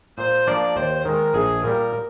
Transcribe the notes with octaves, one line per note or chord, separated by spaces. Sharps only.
A#2 C5
F3 A#3 D4 D5
D#2 C5
D#3 G#3 A#4
A#1 G#4
A#2 G3 A#4